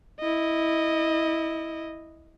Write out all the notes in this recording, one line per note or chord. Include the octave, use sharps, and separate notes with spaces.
E4 D#5